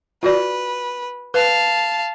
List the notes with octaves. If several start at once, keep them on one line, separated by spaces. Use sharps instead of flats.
F4 F#4 B4 D5
B4 F5 A5